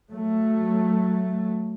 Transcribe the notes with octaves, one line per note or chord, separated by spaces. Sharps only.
F#3 A3